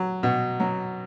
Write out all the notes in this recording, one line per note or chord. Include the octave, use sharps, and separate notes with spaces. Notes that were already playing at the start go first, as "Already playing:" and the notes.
Already playing: F#3
B2
F#3